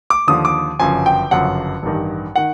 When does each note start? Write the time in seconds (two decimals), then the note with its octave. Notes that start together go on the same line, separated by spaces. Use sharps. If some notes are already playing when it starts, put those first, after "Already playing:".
0.10 D6
0.27 D#2 D3 F3 D#6
0.45 D6
0.79 G1 F#2 C#3 F3 G#5
1.06 G5
1.31 G1 F#2 C#3 F3 F#5
1.83 A1 G2 D#3
2.36 D#3 F#5